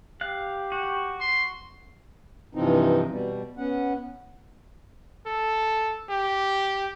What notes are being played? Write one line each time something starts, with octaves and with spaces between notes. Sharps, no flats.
G4 F5 F#6
F#4
C6
G2 C3 E3 F3 C4 D#4
B2 G3
B3 C#4 F#5
A4
G4